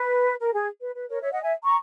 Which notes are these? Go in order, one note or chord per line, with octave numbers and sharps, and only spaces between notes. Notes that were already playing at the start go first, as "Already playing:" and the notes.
Already playing: B4
A#4
G#4
B4
B4
A#4 C#5
C#5 E5
D#5 F#5
E5 G#5
A#5 C#6